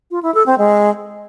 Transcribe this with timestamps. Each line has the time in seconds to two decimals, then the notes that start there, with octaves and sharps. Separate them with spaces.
0.11 F4
0.23 E4
0.34 A4
0.46 C4
0.58 G#3